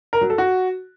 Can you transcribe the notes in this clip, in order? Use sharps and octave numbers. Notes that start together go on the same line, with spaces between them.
A#4
F#3
A4
F#4